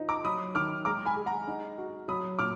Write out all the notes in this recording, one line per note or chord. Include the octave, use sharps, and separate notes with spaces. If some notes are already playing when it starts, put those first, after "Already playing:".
Already playing: F3 D#4
A#5 D6
F#3 B5 D#6
D#3 D6 F6
G#3 A#5 D6
G#5 B5
G#4
F#5 A#5
D#4
F#4
F#3 B5 D#6
A#2 D6 F6